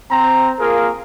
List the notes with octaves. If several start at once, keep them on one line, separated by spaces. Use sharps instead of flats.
C4 A#5
A#3 F4 G#4 A#4